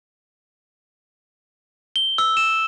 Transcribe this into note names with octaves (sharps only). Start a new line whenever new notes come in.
G7
E6
E7